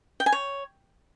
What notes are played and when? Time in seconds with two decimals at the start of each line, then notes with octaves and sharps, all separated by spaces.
0.20 G5
0.26 G#5
0.32 C#5